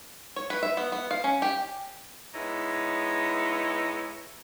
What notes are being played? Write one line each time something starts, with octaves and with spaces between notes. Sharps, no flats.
C#5
B4
E5
B3
B3
F5
C#4
G4
G#3 B3 D#4 E4 C#5